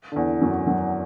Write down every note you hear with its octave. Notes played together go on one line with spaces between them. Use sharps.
D3
E2 E3
F#2 F#3
F#2 F#3